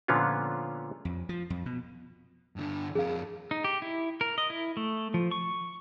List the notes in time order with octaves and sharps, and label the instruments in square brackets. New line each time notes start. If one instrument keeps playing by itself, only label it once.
[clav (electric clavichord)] A#2 D3 F3 B3 C#4 F4
[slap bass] F2
F3
F2
B2
[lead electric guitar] G2 D3
[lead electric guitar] F2 A#4 [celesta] G#4 F5
[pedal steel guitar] D#4
G4
E4
A#4
D#5
E4
A3
F3
C#6